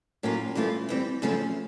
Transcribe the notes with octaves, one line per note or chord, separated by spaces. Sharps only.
A2 F#3 A#3 C#4 F4
G2 E3 A3 C#4 F4
E3 G3 C4
F#2 C#3 F3 A3 C#4